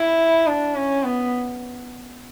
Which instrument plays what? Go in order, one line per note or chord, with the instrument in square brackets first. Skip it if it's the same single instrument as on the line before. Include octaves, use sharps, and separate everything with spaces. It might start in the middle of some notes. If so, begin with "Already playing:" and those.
Already playing: [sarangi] E4
D4
C#4
B3